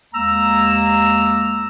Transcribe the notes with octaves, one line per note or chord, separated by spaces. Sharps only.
D#2 G#3 A#3 A#5 E6